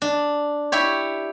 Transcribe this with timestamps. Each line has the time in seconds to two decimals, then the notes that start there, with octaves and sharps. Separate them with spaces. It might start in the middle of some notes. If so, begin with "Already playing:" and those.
0.02 D4
0.72 E4 G4 C#5